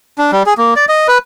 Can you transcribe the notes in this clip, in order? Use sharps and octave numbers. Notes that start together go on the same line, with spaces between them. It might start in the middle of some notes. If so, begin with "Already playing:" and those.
D4
G3
G#4
A#3
D5
D#5
B4